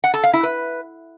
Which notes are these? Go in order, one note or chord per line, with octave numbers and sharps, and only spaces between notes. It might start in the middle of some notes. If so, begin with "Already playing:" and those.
F#5
A4
F5
E4
B4